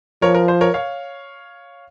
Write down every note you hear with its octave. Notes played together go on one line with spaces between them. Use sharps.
F3 A#4 C#5
A#4
C5
A#4 C#5
C#5 F5